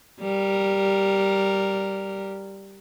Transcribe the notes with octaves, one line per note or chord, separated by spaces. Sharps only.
G3 A#4